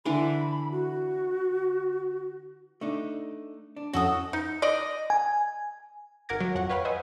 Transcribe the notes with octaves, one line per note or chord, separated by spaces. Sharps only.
D3 E3 D4 B5
F#4
A3 D4 D#4
D4
F2 C#4 E4 F#4 A4 D#6
D#4
D5 D#5
G#5
G#1 A#4 F#5 D6 G#6 A#6
F#3
F2 F#5 C#6 F#6
B4 C#5 F5 G5 B5
B4 C5 D#5 E5 F#5 G#5